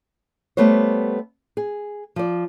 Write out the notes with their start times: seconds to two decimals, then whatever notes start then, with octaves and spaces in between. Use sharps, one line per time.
0.57 G3 A3 B3 C5 C#5
1.57 G#4
2.16 F3 D5